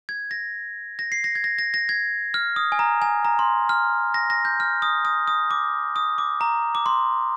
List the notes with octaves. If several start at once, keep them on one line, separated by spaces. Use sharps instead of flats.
G#6
A#6
A#6
C7
A#6
G#6
A#6
A#6
A#6
G#6
F6
D#6
G#5
A#5
G#5
A#5
C6
F6
A#6
A#6
G6
F6
D#6
D#6
D#6
D6
D#6
D6
A#5
D6
C6